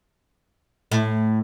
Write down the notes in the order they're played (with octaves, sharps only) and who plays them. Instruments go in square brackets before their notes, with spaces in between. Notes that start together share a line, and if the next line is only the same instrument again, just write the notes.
[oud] A2